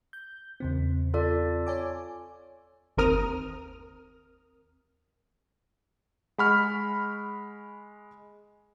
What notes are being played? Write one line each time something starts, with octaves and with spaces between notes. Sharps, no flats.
G6
E2 C#3 C4
F4 A4 D5
C#5 G#5 D6
G1 D#2 C4 A#4 D#6 F6
G#3 F#5 B5 C#6 F6